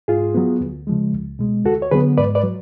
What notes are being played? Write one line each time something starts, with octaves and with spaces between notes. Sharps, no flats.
G#2 F4 G#4
F#3 B3
D2
C#3 F3 G#3
C#2
B2 G#3
D2 F#4 A4
C#5
D3 F#3 B3 G#4 B4
G#2 B4 D5
B4 D5
F#3